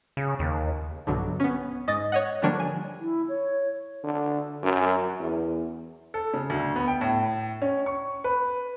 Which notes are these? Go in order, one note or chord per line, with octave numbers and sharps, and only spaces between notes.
C#3
D#2
B1 G2 B2 D3 F#3
B3 C#4
G#2 D#5 D#6 A6
C#5 D#5 F#5
D3 F3 G3 A#3 D4 C#5
G#5
E4
C#5
D3
F#2
E2
A4
C#3
D2
B3
G5
A2
C#4
C#6
B4